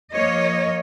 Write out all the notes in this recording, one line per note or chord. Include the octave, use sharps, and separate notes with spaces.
F3 A#3 C#5 D#5